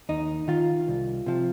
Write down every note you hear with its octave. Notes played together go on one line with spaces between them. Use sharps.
D#2 D#4
D#3 F4
C2
C3 F3